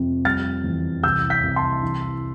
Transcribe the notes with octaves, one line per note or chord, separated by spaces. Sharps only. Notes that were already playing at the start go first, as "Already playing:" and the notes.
Already playing: F2 C3
G3 F6 A6
E2
C2 E6 G6
G6 B6
C2
A5 C6
E3